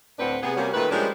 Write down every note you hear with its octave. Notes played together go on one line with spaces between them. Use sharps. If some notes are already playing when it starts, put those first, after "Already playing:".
D2 A2 C4 D4 B4 F#5
C3 B3 G#4
C3 G3 A#3 C#4 F#4
A#2 D#3 A3 B4
F3 G3 G#3 C#4 D4 A#4